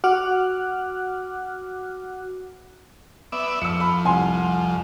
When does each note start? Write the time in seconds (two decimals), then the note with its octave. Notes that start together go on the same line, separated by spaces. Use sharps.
0.04 F#4 F#5 D6 F6 F#6
3.32 B3 D5 E5
3.62 F2 E6 C#7
3.80 B5
4.05 C2 G#5 C6